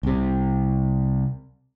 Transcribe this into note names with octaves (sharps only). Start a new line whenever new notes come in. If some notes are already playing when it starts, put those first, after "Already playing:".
C2 C3